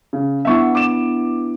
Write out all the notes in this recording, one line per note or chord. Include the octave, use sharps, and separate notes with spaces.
C#3
B3 D4 E4 E5 C#6
D6 E7